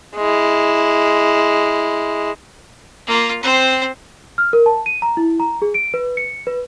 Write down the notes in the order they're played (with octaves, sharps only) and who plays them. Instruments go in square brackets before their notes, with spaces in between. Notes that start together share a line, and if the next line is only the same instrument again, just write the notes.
[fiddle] G#3 E4
A#3 F4
C4 C5
[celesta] F6
A#4
A5
D#7
A#5
E4
A#5
G#4
D7
B4
C#7
B4